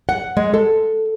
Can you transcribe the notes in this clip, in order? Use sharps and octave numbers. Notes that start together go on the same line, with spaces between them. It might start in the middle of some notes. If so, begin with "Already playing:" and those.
F#5
G#3
A4